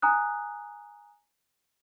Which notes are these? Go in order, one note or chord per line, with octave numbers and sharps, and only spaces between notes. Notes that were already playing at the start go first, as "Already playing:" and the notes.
G#5 A#5 D#6 F#6